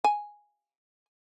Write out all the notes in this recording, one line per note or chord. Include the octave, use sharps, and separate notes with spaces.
G#5